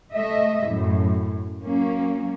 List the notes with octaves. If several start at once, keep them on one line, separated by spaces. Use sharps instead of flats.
A3 D#5 E5
F#2 A2
F#3 A#3 C#4